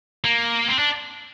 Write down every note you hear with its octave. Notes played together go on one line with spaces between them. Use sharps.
A#3
C4
D4